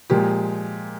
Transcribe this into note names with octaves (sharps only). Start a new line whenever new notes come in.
A#2 F3 G#3 G4